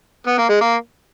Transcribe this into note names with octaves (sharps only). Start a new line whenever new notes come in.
B3
A#3
G#3
A#3